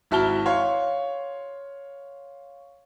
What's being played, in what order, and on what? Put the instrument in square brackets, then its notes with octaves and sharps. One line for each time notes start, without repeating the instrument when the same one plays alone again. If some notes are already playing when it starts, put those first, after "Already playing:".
[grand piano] G#1 E4 F#4 A5 F6 G7
C#5 F5 C6 C#6